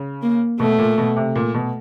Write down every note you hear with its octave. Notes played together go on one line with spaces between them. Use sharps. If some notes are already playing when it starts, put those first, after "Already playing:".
Already playing: C#3
A#3
B2 A3
A#2
B2
C3
A#2
B2